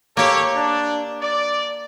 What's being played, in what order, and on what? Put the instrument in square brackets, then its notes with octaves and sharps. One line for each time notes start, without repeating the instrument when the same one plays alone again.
[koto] A#3 G4 [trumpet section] A4 C#5
[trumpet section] D4
D5